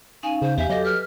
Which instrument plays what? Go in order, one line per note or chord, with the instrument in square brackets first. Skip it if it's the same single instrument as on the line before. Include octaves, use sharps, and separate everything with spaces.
[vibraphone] C#4 D#4 F5 [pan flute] G#5
[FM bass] C#3 [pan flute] C5
[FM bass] E2 [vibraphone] G4 F5 G#5 [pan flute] E5
[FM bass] F#3 [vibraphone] G4 A4 D6 [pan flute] D#5
[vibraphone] B4 [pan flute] F6